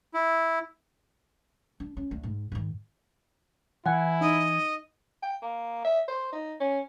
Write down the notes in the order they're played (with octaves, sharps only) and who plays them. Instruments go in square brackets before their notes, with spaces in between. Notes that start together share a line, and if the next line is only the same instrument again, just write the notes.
[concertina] E4
[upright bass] D4
C#4
D2
G#2
G#2 D#3
[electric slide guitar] E3 G#5 [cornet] E4 [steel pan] F#5
[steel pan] D#4 [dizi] D#5
[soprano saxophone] G5
A#3
E5
C5
D#4
C#4